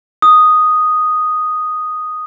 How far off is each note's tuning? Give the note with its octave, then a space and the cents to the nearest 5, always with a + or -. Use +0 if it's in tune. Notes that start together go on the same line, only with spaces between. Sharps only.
D#6 +0